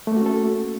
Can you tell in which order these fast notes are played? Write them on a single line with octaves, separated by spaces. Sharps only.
A3 A#3 F#4 C#4 A4